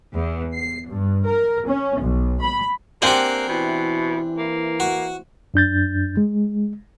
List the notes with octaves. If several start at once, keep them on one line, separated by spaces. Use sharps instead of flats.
E2
C7
G2
A#4
C#4
B1
B5
A#3 C4 D4 G4 F#5 G#5
B2 E3 E4
A#3
F#4
F#2 D4 G6 A6
G#3